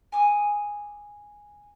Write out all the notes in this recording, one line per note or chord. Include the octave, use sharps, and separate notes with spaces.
G#5 D6 D#6